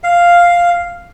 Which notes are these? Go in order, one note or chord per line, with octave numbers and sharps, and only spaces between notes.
F5